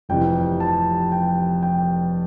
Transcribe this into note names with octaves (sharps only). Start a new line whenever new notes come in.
F1 F2 C3 E3 G5
A5
G5
G5